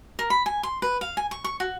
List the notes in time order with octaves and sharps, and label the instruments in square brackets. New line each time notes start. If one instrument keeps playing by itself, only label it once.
[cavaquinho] A#4
B5
G#5
C6
B4
F5
G#5
C#6
C#6
F#4